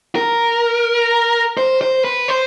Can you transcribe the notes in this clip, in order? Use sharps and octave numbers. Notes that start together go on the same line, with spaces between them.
A#4
C5
C5
B4
C5